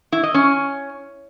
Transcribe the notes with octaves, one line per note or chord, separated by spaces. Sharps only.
E4
D#5
C#4